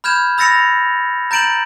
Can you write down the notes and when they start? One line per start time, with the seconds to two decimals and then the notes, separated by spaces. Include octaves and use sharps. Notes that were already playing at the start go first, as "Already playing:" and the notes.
0.04 B5 F6 G6 G#6 E7
0.38 B5 E6 A6 A#6 C#7 F7
1.31 A#5 G6 A6 D7 E7 F#7